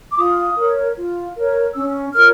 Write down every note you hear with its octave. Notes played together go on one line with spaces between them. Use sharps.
D6
F4 D#6
A#4 C#5
F4
A#4 C#5
C#4 E6
F4 A#4 C#5 F6